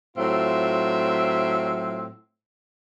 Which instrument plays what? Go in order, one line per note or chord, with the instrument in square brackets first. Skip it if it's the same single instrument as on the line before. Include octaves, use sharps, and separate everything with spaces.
[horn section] A2 F#3 C4 F4 E5